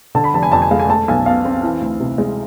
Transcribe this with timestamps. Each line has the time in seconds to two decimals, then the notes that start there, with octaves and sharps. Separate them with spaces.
0.15 D3 A5
0.24 B5
0.34 F1 A5
0.43 G#5
0.52 F2 A5
0.62 G#5
0.71 G#3 F5
0.80 G#5
0.89 A3 A5
1.08 B1 G#5
1.26 B2 F5
1.45 C4
1.63 E3
1.81 D2
2.00 C3
2.18 G#3